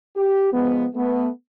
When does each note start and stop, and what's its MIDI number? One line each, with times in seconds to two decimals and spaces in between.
0.17 0.51 67
0.53 0.86 44
0.53 0.86 53
0.53 0.86 56
0.53 0.86 59
0.95 1.28 57
0.95 1.28 59